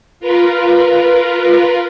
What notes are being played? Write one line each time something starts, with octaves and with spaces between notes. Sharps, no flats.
F4 A#4 B4